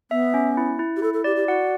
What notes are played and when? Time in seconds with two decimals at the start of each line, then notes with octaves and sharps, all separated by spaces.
0.11 B3 E5
0.34 C#4
0.57 E4
0.79 E4
0.97 G4
1.02 E4 A4
1.14 A4
1.24 G4 D5
1.36 G4
1.47 F#4 F#5